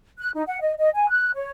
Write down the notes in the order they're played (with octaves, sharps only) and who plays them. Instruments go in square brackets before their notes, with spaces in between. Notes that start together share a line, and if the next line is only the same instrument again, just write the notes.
[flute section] F#6
D#4
F#5
D#5
D#5
G#5
F#6
C#5